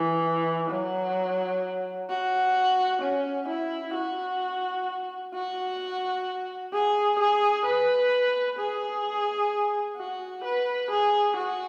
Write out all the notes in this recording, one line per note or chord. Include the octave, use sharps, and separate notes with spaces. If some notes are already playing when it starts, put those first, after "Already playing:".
Already playing: E3
F#3
F#4
C#4
E4
F#4
F#4
G#4
G#4
B4
G#4
F#4
B4
G#4
F#4